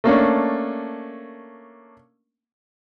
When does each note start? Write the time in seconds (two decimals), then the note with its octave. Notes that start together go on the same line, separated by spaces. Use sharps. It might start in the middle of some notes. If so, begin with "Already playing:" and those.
0.04 A3 A#3 C#4 D4